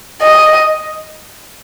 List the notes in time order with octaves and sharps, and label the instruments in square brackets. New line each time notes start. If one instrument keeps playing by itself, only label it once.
[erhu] D#5